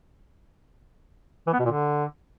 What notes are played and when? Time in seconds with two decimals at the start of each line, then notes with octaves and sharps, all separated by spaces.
1.47 E3
1.53 B3
1.59 B2
1.65 A#2
1.71 D3